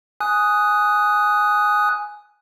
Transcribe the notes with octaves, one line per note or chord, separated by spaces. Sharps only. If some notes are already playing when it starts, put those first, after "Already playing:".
G#5 D#6 F#6